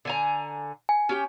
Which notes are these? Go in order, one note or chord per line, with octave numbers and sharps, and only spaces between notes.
D3 G#5 A#5
G#5
C#4 G4 G5